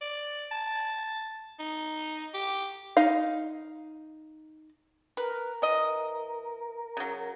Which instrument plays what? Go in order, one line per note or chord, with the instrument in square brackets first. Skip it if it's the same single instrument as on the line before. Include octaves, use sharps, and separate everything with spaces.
[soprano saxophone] D5
A5
D#4
G4
[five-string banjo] D#4 F5
[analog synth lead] A#4 [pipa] B4
[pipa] E3 D#5
C#3 F#3